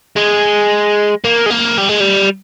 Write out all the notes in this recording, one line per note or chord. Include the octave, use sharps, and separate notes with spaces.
G#3
A#3
G#3
A#3
G3
G#3
G3